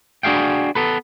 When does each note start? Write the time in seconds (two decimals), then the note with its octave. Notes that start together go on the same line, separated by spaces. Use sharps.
0.23 D4 F#4 G#4 F5 G5
0.75 B3 A4 B4